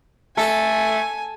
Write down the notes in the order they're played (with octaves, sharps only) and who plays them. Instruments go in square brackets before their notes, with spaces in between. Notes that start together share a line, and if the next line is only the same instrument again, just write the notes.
[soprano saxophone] A3 [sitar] A4 [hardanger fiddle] G#5